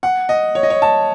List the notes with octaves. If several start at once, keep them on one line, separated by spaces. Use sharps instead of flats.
F#5
D#5
C#5
D#5
C#5
A5